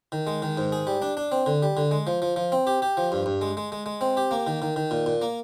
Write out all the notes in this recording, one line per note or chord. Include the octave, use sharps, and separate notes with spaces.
D#3
G#3
D#3
G#2
G#4
G3
D4
D4
C4
D3
G3
D3
G#3
F3
F3
F3
C4
G4
G4
F3
G2
G2
G#3
G#3
G#3
G#3
C4
G4
A#3
D#3
D#3
D#3
A#2
A#2
A#3